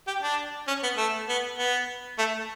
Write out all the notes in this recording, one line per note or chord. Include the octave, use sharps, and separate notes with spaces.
G4
D4
C#4
B3
A3
B3
B3
A3